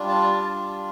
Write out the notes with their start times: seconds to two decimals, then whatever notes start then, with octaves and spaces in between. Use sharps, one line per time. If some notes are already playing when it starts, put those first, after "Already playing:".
Already playing: G3 D4 F4
0.09 A5
0.32 A5